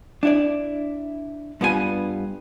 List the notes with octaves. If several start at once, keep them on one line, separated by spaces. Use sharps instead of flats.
D4 E4 D5
G2 G3 B3 F4 G#4 G#5